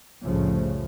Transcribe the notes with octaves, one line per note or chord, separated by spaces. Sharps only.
C2 F2 A2 C#3 F3 A3